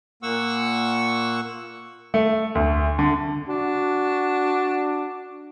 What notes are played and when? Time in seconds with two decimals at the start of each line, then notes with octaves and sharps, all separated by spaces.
0.23 A#2 A#3 F#5 C#6 E6
2.14 A3
2.55 D2
2.99 D3
3.48 D4 F#4